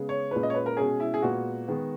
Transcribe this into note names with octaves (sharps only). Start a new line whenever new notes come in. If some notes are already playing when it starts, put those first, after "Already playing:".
Already playing: C#3 G#3 B3
C#5
A#2 G#3 C#4 B4
D#5
C#5
B4
A#4
B2 G#3 C#4 G#4
E4
G#4
A#2 G#3 B3 F#4
D#3 G#3 B3